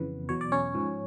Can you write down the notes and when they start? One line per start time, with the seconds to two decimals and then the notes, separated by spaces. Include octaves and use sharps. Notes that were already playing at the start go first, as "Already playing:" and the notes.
Already playing: F2 C#3 E3 B3 B4
0.29 E2 B2 F#3 C#5
0.41 D5
0.52 C#4 C#5
0.75 G#2 F3